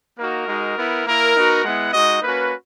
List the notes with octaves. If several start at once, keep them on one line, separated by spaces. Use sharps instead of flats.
A#3 D#4 F#4 A#4
G#3 D#4 F#4
B3 E4
A#3 E4 A#4
B3 D#4 F#4
G#3 B3 E4 F#5
G#3 D#4 F#4 D#5
A#3 C#4 F#4 B4